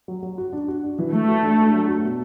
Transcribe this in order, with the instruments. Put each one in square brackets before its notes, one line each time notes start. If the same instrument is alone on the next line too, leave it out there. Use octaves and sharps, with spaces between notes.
[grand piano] F#3
F#3
F#4
D4
F#4
D4
E3
[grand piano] E3 [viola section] A3
[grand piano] F#4
D4
D4
F#3
F#4
B2